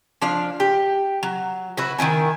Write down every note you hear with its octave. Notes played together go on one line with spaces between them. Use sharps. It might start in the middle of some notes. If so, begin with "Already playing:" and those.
F3 D4 F5
G4
F#3
E4 F#4 B4
D#3 F3 E4 G#5